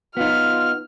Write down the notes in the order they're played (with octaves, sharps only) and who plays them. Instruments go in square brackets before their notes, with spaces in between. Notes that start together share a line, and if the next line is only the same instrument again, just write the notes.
[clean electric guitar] B3 D#4 [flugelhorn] F4 [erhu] F6